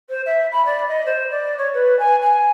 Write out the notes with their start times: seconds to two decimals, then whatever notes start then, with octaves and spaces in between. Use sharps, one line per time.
0.09 C5
0.26 E5
0.51 B5
0.65 D5
0.87 D#5
1.06 C5
1.30 D5
1.58 C#5
1.74 B4
1.99 G#5
2.22 G#5